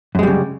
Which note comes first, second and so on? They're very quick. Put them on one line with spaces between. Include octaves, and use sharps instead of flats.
F#2 G#3 G3 C#3